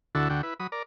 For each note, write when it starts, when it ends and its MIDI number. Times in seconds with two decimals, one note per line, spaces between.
0.15 0.28 38
0.15 0.28 50
0.15 0.28 64
0.15 0.28 66
0.15 0.28 69
0.30 0.42 38
0.30 0.42 50
0.30 0.42 66
0.30 0.42 79
0.43 0.54 64
0.43 0.54 71
0.60 0.67 54
0.60 0.67 83
0.60 0.67 87
0.72 0.83 70
0.72 0.83 74